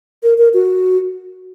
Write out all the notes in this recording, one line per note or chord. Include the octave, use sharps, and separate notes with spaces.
A#4
A#4
F#4